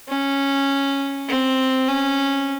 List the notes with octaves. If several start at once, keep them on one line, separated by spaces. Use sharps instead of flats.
C#4
C4
C#4